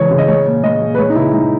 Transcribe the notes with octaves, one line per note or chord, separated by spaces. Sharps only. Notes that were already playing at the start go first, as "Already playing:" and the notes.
Already playing: C#3 E3 G#3 C#5
C#3
D#5
G#3 C#5
A#2
G#3 D#5
A#2
B4
G#3 C#5
D#4
C#3 E4
G#3 D#4